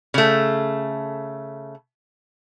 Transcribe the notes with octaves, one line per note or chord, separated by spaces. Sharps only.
C#3 A3